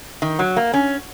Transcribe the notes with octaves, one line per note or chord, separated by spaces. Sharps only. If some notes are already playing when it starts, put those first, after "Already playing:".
D#3
F#3
A#3
C#4